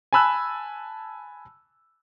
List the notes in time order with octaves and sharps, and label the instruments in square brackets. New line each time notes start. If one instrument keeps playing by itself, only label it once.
[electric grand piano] G#5 A5 B5 E6 F#6